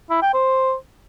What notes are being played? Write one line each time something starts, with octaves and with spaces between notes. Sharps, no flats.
E4
G5
C5